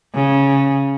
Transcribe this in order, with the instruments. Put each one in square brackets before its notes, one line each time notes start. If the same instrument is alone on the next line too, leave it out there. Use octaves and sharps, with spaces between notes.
[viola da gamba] C#3